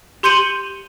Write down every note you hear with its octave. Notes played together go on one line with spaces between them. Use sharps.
G4 C6 G6 C#7 D#7 F#7